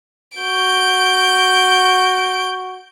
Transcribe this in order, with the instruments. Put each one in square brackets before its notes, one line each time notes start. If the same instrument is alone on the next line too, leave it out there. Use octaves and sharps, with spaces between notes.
[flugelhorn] F#4 [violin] G6 D7